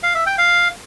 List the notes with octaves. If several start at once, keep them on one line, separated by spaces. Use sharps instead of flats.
F5
E5
G5
F5